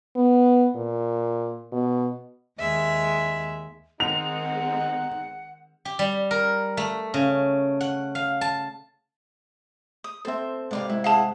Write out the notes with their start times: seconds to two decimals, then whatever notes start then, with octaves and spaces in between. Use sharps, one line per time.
0.16 B3
0.75 A#2
1.72 B2
2.59 D#2 G#3 E5
4.00 D#3 G#3 C4 D#4 F#5 F7
5.85 G4
5.99 G3
6.31 A#4
6.77 A3
7.14 C#3
7.81 F#5
8.15 F5
8.41 A5
10.04 D#6
10.25 C4 A4 C5 E5
10.71 G#2 C3 B4 D5 F5
10.90 G#3 E4
11.04 E4 G#4 F5 F#5 A5